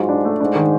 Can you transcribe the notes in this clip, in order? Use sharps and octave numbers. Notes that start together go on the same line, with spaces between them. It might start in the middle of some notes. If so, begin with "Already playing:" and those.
Already playing: G#2 F#3 F4
D4
A3
G#2 D4
D#3